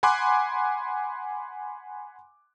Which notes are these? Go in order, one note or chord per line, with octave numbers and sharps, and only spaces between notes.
F#5 G#5 B5 C6 D6 F#6